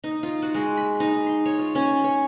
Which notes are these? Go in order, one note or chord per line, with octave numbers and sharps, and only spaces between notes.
D#4
F4
F#4
G#3
B5
D#4
C6
C#5
F4
C#4
C#5